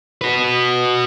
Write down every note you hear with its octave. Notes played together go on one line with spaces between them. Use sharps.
F#4 B4